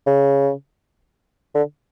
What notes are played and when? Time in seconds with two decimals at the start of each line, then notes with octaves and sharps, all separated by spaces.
0.07 C#3
1.55 D3